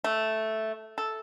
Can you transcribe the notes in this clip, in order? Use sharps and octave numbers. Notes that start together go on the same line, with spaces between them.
A3
A4